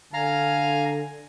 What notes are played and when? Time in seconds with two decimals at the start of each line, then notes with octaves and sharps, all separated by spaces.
0.14 D3 F5 G#5 A#5 F6